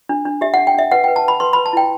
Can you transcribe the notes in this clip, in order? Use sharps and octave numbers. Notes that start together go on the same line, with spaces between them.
D4
D4
G4 E5
F#5
D4
G5
D4 E5
B4 F#5
G5
B4
A5
B4 B5
B4 C6
B4 B5
A5
E4 G5